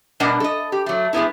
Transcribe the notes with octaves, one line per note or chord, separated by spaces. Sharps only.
B2 G3 D4 A#4 D#5 F#5
A4 D#5
G4
F#3 A3
G#3 A3 B3 E4